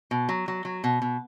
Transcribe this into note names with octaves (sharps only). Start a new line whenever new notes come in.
B2
F#3
F#3
F#3
B2
B2